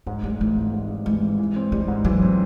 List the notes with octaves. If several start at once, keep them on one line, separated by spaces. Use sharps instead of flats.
G#2 A#3
G3 A3
E3 A3
G#1
G#2
G3
E3 G#3
G#1
E3
C4
G3 G#3
G#2
E3 F#3
C4